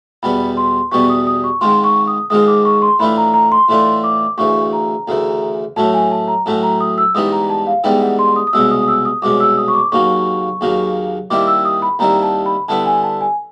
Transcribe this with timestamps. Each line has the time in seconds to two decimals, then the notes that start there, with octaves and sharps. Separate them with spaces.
0.23 E2 B2 G3 B3 B5
0.57 C6
0.91 E2 B2 G3 B3 C#6
1.10 D#6
1.27 D#6
1.44 C#6
1.61 G#2 D#3 G#3 C4 F4 C6
1.84 C#6
2.07 D#6
2.30 G#2 D#3 G#3 C4 F4 D#6
2.47 D6
2.65 C#6
2.82 C6
2.99 A2 E3 A3 D4 F4 B5
3.17 A#5
3.34 A#5
3.52 C6
3.69 A2 E3 A3 D4 F4 C6
4.04 D6
4.38 D2 C#3 E3 C#6
4.73 A#5
5.08 D2 C#3 E3
5.76 A2 F#3 A3 C#4 A5
5.94 G#5
6.11 A5
6.28 A#5
6.46 A2 F#3 A3 C#4 A5
6.63 A#5
6.80 D#6
6.98 E6
7.15 G#2 E3 G3 B3 D#4 D#6
7.32 A#5
7.50 A5
7.67 F5
7.84 G#2 E3 G3 B3 D#4 G5
8.01 F#5
8.19 C6
8.36 D#6
8.47 D#6
8.53 C2 B2 G#3 C#4 E6
8.71 D#6
8.81 D#6
8.88 E6
9.05 D#6
9.22 C2 B2 G#3 C#4 D6
9.40 E6
9.57 D#6
9.68 C#6
9.74 D6
9.92 D#2 C#3 F#3 A#3 C#6
10.61 D#2 C#3 F#3 A#3
11.30 D#2 D#3 G3 C4 E4 D6
11.47 E6
11.65 D#6
11.82 B5
11.99 D#2 D#3 G3 C4 E4 A#5
12.23 A5
12.46 B5
12.69 D3 G3 B3 E4 A5
12.86 G#5
13.03 A5
13.21 G#5